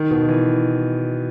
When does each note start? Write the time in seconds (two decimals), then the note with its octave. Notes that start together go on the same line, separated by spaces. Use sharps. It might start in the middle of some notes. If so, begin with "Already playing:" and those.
Already playing: D#3
0.11 B2
0.29 E3